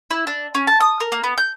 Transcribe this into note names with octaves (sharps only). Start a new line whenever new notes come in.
E4
D4
C#4
A5
D#6
A#4
A#3
B3
G6